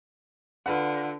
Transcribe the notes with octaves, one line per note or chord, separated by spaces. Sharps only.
D3 F4 B4 F#5